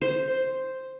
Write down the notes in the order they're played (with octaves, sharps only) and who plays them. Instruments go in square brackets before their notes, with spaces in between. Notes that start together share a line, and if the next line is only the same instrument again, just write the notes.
[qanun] C5